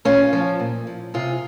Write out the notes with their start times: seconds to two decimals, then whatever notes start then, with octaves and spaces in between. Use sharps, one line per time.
0.05 A#2 C#4 F4
0.33 F3
0.60 A#2
0.87 F3
1.14 C3 F4 G#4